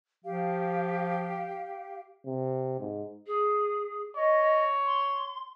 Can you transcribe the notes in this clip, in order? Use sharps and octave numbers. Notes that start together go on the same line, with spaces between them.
F3 G4 F5
C3
G#2
G#4
C#5 D#5
C6